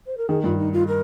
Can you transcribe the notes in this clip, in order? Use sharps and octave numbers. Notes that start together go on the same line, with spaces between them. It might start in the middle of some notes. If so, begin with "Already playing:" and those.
C5
A#4
D#3 G#4
G2 F4
D#4
F4
A#4